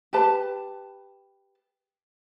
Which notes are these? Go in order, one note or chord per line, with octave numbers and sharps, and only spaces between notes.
G4 B4 A5